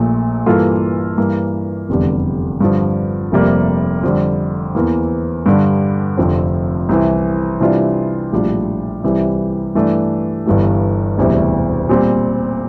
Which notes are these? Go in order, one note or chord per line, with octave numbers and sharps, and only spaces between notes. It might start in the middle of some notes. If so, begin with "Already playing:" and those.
Already playing: A#1 A#2 A3
G2 E3 A#3 F4 A4
G2 E3 A#3
F1 E2 D3 G3
G2 D3 F3
F1 F2 C3 G3 A#3
F2 D3 G3
E2 E3 A#3
G2 D3 G3
F1 F2 D3 F3 C4
C2 C3 E3
C3 E3 G3 D4 F4
A#1 A2 G3 D4 F4
C2 C3 E3 G3
G2 E3 A3 D4
G1 G2 E3 G3
E1 D2 C3 E3 G3
A#2 G3 C4